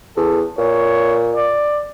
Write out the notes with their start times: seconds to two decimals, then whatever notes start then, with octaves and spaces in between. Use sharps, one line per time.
0.16 E2 A4
0.58 A#2 C#5
1.35 D5